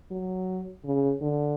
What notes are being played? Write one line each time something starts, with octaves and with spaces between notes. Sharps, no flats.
F#3
C#3
D3